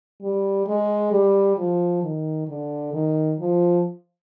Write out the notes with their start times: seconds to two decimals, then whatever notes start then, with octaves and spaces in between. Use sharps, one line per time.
0.21 G3
0.67 G#3
1.12 G3
1.57 F3
2.03 D#3
2.48 D3
2.93 D#3
3.39 F3